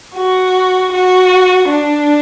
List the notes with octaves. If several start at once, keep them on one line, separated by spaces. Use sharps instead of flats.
F#4
F#4
D4